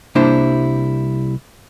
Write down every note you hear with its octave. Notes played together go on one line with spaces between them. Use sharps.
C2 G3 A#3 D4 E4 C5